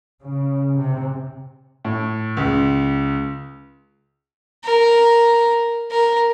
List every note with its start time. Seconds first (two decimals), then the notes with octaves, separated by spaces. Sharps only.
0.22 C#3
0.78 C3
1.85 A2
2.37 C#2
4.64 A#4
5.91 A#4